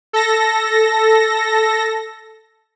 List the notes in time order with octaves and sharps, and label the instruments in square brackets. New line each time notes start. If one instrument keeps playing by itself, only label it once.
[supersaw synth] A4 A#6